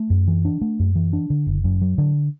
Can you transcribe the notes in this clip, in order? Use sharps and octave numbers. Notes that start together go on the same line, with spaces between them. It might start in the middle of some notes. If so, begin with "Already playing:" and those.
Already playing: A3
F#2
E3
D4
A3
F#2
E3
D4
D3
F#1
F#2
F#3
D3